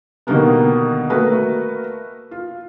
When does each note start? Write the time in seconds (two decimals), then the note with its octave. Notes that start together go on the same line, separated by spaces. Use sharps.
0.27 B2 D3 D#3 G3 A#3 B3
1.10 A3 A#3 F#4 A#4 B4
2.31 F4